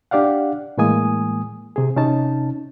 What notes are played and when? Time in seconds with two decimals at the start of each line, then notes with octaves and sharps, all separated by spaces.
0.11 D4 G4 D5 F5 F#5
0.78 A2 E3 G#3 A#3 G#5 D#6
1.76 C3 G#4
1.96 C3 C#4 D#4 A5